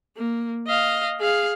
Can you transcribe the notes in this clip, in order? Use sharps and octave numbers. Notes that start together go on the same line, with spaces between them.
A#3
D#5 F5
G#4 F5